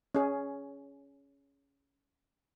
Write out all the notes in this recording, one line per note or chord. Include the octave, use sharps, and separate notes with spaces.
C#4 G#4